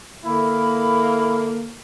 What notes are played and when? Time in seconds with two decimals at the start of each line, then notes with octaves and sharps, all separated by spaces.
0.25 D3 A#3 E4 B5